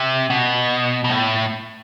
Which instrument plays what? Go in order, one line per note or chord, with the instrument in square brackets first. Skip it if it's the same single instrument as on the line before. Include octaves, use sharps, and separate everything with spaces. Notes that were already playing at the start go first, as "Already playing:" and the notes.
Already playing: [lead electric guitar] C3
B2
B2
A2